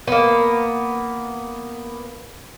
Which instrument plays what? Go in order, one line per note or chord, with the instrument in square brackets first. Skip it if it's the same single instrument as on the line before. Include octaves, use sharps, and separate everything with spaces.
[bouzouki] A#3 B3